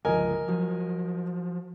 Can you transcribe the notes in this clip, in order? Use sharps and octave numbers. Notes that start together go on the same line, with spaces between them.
G1 C#2 F3 A#4 D#5 G#5
F3 F#3